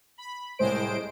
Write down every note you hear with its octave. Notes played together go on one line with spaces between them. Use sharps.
B5
C2 A2 G#3 C5 D7